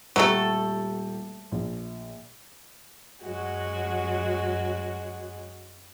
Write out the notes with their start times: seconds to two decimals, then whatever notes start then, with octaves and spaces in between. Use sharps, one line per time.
0.16 D#1 F#3 A3 G4 A4
1.52 A#1
3.23 F#2 F#3 G#3 F#4